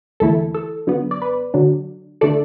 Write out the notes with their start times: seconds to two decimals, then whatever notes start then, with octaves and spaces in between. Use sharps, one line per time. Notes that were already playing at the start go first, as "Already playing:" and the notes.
0.20 E2 D3 A3 E4 A4
0.54 A4
0.87 F#2 D3 B3
1.11 D5
1.22 B4
1.54 D3 F#3 D4
2.21 D3 A3 D4 A4 D5